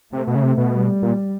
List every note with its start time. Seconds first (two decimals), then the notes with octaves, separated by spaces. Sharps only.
0.12 C3 A3
0.27 B2
0.35 C#3
0.43 C3
0.57 B2
0.72 G3
1.02 A#2